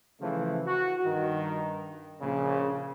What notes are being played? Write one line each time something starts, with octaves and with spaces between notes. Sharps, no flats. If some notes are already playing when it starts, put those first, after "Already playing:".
C#3 E3 F3 A3
F#4
G2 D#3
A#1 C#3